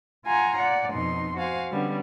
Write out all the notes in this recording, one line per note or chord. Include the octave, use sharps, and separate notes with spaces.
F4 F#5 G#5 A#5 C6
D5 F#5
F2 B2 D#4 C6
F#4 C5 F5 G#5
D3 G3 B3 C#4